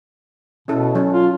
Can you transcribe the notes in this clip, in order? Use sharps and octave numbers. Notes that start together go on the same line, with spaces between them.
B2 C#4 E4 A4
F#3 C#4 A4
F4